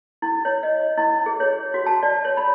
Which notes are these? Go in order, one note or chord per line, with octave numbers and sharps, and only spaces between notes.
E4
C#5
D#5
E4
G#4
C#5
F#4
A5
D5
C#5
B5